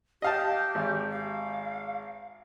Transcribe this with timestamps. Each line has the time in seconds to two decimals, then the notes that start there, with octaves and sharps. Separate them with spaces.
0.22 G4 D#5 F5 A5
0.75 G#1
1.10 F5